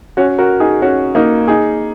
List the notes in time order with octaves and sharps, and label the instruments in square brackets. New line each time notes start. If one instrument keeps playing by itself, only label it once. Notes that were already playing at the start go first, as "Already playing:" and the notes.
[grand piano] C#4 F#4
F#4 A#4
D#4 G#4
C#4 F#4
A#3 D#4
D#4 G#4